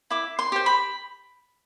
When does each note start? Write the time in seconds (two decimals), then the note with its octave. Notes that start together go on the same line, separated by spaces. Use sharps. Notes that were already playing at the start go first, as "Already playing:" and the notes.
0.11 E4 D6
0.39 C6
0.52 G4 C5
0.66 B5